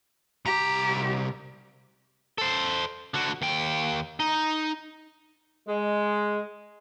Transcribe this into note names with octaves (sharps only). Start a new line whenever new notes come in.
C2 G4 A#5
A4 C5
D3 F#4
D#2 G5
D#4
G#3